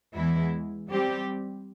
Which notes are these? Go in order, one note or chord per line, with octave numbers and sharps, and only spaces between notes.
E2 E3 G#3 E4
G3 C4 G4